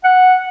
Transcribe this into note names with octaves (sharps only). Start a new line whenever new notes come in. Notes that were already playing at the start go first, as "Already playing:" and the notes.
F#5